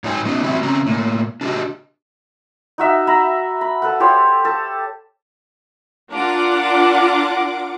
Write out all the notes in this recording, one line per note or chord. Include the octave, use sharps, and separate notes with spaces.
G#2 F#3 D#4 C5 G5 G#5
F#3 B3 C#4 D#4 D#5
E3 G3 C4 E4 F#4
C#3 C4 C#4 A#5
A2 A#3
D4 F#4 G4 D#5
D#4 F#4 E5
E5 A#5 B5
B5
A4 B4 F#5
G4 A4 C5 C#5
A4
D4 F4 A#4 F#5 D6